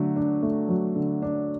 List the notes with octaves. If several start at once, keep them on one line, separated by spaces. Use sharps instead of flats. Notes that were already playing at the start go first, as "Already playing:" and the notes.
Already playing: D3 F#3 A3
D4
A3
F#3
D3
D4